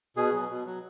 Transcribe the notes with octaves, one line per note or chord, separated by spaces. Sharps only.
B2 G#4
F#3
B2
F#3